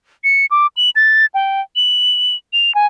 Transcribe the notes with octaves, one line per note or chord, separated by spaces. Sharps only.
C#7
D6
F#7
A6
G5
F#7
F7
G#5